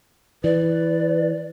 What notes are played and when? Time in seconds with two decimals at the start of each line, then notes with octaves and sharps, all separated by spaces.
0.44 E3 B4 D5